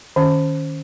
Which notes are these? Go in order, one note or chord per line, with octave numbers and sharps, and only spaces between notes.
D#3 C#4